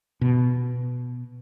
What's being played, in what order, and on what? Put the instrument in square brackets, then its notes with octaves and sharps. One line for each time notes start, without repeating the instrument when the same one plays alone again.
[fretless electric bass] B2